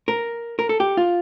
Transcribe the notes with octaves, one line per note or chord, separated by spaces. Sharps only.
A#4
A#4
A4
G4
F4